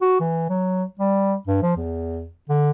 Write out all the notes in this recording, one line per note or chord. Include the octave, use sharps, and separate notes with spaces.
F#4
E3
F#3
G3
G2
F3
E2
D3